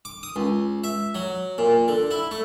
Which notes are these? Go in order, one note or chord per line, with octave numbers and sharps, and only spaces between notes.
D6
D#6
C#2
E5
F#3
A#2
D3
E4
A3